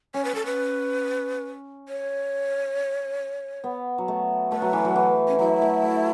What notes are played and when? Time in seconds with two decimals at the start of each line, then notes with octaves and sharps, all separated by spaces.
0.14 C#4 C#5
0.25 B4
0.33 C#4 A4
0.46 B4
1.89 C#5
3.64 B3
3.98 F#3
4.08 A3
4.52 A3 B4
4.62 F#3
4.73 E3
4.85 F#3
4.96 E3
5.28 C#4
5.39 F#3 E4
5.62 A3
5.83 A3